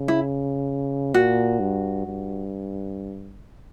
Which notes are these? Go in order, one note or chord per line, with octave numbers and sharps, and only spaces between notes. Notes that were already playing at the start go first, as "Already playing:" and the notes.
Already playing: C#3
E4
A#2 F#4
G2
G2